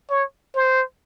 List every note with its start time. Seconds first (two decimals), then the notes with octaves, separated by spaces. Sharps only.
0.10 C#5
0.55 C5